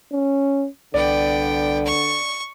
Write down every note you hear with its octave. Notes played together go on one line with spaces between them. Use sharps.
C#4
C2 D3 B3 D5 G5
C#6